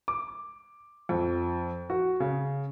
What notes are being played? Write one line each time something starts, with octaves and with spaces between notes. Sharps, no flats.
D6
F2
F#4
C#3